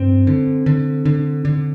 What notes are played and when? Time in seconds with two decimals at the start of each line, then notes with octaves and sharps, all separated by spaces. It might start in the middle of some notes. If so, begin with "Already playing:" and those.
Already playing: G2 C4
0.27 D3
0.66 D3
1.05 D3
1.45 D3